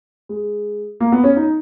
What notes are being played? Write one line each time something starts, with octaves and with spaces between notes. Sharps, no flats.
G#3
A#3
B3
C#4
D#4